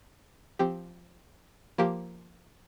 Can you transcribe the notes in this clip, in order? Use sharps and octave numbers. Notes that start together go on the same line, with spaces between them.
F3 C4 G4
F3 A#3 G4